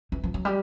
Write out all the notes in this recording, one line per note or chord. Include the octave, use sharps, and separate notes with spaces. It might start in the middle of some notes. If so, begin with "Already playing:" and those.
E3
F3
F#3
G3